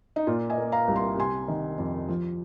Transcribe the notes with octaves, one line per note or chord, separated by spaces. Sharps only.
D#4
A#2 F4
D#5 G#5
A#3
F5 A#5
C2
C6
C3 G#5 C6
D#3
F2
F3